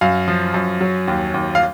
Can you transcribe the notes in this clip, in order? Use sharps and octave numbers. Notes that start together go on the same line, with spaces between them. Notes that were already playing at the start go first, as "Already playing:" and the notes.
F#2 F5
F3
F#2
F#3
D#2
D#2
F5